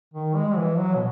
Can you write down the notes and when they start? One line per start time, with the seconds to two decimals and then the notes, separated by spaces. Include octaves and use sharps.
0.14 D#3
0.36 G#3
0.57 E3
0.78 F#3
0.95 B2